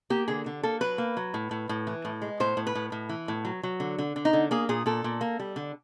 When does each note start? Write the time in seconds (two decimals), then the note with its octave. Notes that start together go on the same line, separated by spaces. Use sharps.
0.10 A#3 G4
0.28 D3 G#4
0.46 D3
0.63 A#3 A4
0.81 F#3 B4
0.98 A#3
1.17 F#3
1.34 A2
1.51 A2
1.69 A2
1.87 E3
2.05 A2
2.22 G#3
2.40 A2 C5
2.57 A2
2.67 B4
2.75 A2
2.92 A2
3.09 E3
3.28 A2
3.45 F#3
3.63 F#3
3.80 D3
3.98 D3
4.16 D3
4.25 D#4
4.33 D3
4.51 A#3 G#4
4.69 A#2 G#4
4.86 A#2 A4
5.04 A#2
5.21 A#3
5.40 G3
5.56 D3